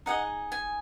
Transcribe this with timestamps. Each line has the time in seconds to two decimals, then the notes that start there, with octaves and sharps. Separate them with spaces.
0.06 D#4 G#4 D#5 F#5
0.52 G#5